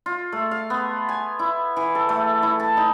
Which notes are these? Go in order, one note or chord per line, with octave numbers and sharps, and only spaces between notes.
F4
A3
F5
B3
G#5
E4
E3
A4
A3
E4
A5
D#4